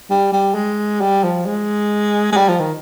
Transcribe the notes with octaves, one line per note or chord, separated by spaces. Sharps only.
G3
G3
G#3
G3
F3
G#3
G#3
G3
F3
D#3